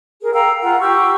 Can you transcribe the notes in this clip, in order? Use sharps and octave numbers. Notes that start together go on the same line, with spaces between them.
G#4 A#4
F5 G5 A#5 E6
F4 F#5 G5 A#5
G4 C#6 E6